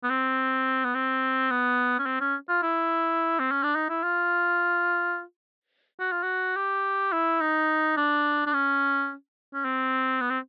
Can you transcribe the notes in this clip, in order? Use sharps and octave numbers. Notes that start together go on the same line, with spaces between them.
B3
C4
B3
C4
B3
C#4
C4
C#4
F4
E4
C4
C#4
D4
D#4
E4
F4
F#4
F4
F#4
G4
E4
D#4
D4
D4
C#4
C#4
C4
B3
C4